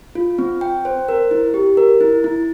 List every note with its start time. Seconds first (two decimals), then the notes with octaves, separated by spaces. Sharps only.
0.15 F4
0.38 C4
0.61 G5
0.85 C5
1.09 A#4
1.31 E4
1.54 G4
1.77 A#4
2.01 E4
2.24 E4